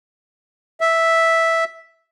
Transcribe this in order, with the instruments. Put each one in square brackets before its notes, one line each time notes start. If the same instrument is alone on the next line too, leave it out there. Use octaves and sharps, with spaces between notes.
[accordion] E5